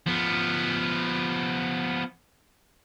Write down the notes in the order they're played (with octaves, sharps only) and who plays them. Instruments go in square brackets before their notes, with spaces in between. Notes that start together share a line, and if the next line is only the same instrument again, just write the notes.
[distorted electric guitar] F3 B3